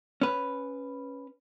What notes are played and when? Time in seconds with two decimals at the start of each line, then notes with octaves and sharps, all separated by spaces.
0.21 C#4 B4